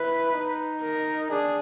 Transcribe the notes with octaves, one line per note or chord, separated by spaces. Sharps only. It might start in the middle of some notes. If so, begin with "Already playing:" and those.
Already playing: E4 B4
D#4
A#4
D4 G#4